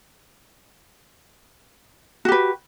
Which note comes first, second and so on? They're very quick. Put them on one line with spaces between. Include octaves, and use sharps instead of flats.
F#4 G4 B4